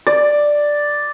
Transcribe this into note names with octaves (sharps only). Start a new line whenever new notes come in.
D5